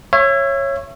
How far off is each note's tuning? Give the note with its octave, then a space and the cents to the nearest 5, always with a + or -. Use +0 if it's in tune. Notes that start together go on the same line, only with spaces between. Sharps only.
C#5 -15 E5 +30